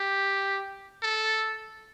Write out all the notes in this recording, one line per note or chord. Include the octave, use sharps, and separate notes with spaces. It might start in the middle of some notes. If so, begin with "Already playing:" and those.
Already playing: G4
A4